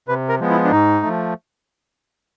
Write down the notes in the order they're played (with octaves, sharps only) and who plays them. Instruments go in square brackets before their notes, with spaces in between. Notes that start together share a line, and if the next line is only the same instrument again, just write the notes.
[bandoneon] C3 B4
A#4
F3 G#3 B3
E4
D4
G#2 D#4
F3 A3